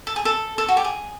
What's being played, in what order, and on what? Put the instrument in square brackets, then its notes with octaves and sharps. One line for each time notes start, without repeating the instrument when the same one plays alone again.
[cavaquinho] A4
G#4
A4
A4
F#4
G4
G#4